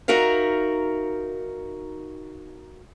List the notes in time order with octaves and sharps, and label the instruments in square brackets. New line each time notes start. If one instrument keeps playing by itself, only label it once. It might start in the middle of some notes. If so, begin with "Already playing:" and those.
[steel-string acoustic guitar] D#4 F#4 A#4 E5 F5